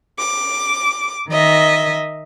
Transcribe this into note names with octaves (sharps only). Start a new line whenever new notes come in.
D6
D#3 D#5 E5